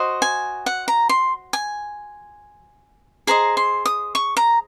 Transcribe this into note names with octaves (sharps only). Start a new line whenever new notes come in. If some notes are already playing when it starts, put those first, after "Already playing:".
Already playing: F#4 C5 D#5
G#5
F#5
A#5
C6
G#5
G#4 C5 D#5 A#5
C6
D#6
C#6
A#5